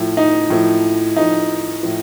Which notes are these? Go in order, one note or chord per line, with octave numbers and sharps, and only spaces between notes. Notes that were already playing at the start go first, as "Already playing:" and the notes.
Already playing: A2 F3
D#4
A2 F3
A2 F3 D#4
A2 F3